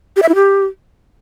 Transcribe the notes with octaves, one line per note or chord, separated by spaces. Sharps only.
G4
E5
E4
G4